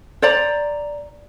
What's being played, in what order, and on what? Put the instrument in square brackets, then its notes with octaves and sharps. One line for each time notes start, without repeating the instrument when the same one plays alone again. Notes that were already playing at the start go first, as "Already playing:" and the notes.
[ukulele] C5 D5 A#5